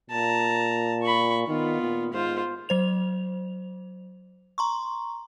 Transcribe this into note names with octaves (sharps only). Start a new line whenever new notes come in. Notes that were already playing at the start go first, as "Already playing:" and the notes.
A#2 A5 A#5
B5 C#6
D#3 B3 F4
A#2
G#2 F4 C5
F#3 C5 F7
A#5 C6 C#6